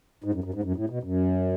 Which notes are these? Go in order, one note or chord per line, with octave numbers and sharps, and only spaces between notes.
G#2
F#2
F#2
G#2
F#2
A2
B2
F#2